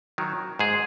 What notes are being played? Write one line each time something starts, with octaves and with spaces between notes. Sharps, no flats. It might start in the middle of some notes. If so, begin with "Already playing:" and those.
D#3 F#3
G#2 G#4